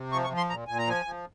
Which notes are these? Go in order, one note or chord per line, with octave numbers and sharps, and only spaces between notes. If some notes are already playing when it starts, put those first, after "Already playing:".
Already playing: C3
F3 C#6
C#6
F3
C6
A#2 A#5
A#2 G#5
A#5
F3 G#5
F3